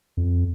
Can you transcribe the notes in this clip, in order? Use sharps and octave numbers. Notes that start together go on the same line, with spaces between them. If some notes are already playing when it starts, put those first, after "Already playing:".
F2